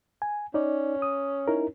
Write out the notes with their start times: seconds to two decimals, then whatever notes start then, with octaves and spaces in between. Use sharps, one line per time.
0.22 G#5
0.54 C#4 D#4 D5
1.02 D#6
1.48 D#4 E4 A#4